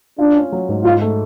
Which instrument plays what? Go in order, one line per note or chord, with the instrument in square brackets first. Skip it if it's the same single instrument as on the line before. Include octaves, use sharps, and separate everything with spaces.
[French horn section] D4 [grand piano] F4
[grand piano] C#4
F#3
G#2
[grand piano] G#2 [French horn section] F4
[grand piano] A3